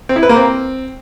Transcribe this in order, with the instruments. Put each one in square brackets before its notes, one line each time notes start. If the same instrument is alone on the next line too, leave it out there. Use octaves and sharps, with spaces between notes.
[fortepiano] C4
E4
B4
A#3
C4